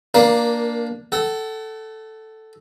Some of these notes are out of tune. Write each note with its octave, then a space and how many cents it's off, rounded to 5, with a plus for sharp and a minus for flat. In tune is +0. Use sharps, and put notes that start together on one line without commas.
A#3 +0 D4 +0 A#4 +25
A4 +0 F#5 +40